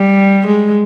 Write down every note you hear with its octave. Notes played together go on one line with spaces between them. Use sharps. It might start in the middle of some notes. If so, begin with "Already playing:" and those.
Already playing: G3
G#3